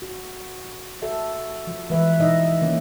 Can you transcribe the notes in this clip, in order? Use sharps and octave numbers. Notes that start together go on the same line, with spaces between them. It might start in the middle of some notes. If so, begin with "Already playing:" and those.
F#4
F#4 A4 D5 E5
F3
E3 F3 G#3 B4 E5
B2 D#4 E4 D#5 E5
D#3 A#3 C#4